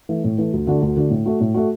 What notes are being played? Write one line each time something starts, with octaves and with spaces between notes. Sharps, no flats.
E3 A3
A2
E3 A3
D2
D3 A3 D4 F#4
D2
D3 A3 D4 F#4
A2
A3 F#4
A2
A3 F#4